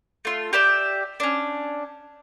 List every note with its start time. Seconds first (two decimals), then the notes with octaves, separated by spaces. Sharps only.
0.25 A3 F4
0.53 G4 D5 E5 G5
1.20 C#4 D4